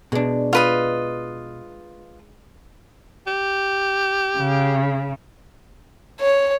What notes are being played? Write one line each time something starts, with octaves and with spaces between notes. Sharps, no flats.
B2 G#3 D4
F4 B4 D#5
G4
C#3
C#5